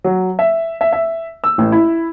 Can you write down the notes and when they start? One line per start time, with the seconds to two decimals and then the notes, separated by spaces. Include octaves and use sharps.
0.04 F#3
0.39 E5
0.81 E5
0.93 E5
1.44 E6
1.58 A1
1.72 E4